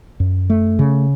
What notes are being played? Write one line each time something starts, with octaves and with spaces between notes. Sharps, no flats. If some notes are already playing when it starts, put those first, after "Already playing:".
F#2
A3
C#3